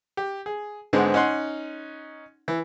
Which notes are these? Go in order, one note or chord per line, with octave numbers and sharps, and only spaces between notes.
G4
G#4
G#2 D3 G#3 B3 C4
C#4 D#4 F#5 C6
E3